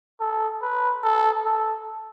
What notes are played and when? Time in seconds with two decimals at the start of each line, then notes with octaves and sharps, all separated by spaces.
0.20 A4
0.62 B4
1.03 A4
1.45 A4